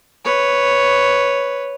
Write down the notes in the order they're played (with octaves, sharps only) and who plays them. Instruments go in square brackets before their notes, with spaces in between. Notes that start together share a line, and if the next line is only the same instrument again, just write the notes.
[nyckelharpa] B4 C#5